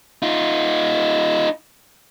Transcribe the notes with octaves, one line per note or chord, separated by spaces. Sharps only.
D#4 F4